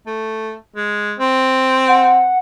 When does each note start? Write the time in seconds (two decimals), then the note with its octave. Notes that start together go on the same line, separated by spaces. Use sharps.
0.07 A3
0.76 G#3
1.18 C4
1.88 F#5